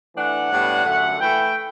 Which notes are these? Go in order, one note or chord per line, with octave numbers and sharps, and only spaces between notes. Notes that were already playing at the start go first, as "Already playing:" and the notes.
E3 A3 D4 F#5
A2 G3 B3 D4
F#2 D3 A3 F#5
E3 A3 E4 G5